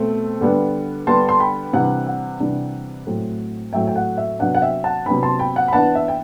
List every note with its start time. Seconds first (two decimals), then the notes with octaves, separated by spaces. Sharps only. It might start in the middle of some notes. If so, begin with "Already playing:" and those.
Already playing: B2 A3 C4
0.41 D3 G3 B3 D4
1.07 D3 G3 B3 D4 A5 C6
1.29 C6
1.40 G5 B5
1.73 C3 E3 G3 D4 F#5
2.07 F#5
2.40 C3 E3 G3 D4
3.06 A2 F#3 A3 C4
3.73 A2 F#3 A3 C4 E5 G5
3.87 G5
3.96 F#5
4.18 E5
4.39 C3 F#3 B3 D4 F#5
4.55 F#5
4.62 E5 G5
4.84 F#5 A5
5.06 C3 F#3 B3 D4 G5 B5
5.23 A5 C6
5.39 G5 B5
5.56 F#5
5.68 B5
5.73 E3 B3 D4 F#5 A5
5.95 E5
6.08 G5